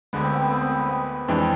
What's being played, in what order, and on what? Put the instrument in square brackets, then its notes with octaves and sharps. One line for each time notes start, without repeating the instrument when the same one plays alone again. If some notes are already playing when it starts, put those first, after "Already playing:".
[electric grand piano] D2 D3 G#3 [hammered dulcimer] B3
[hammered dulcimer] C4
B3
C4
B3
C4
B3
C4
B3
[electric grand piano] F2 E3 G#3 D4 [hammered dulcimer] C4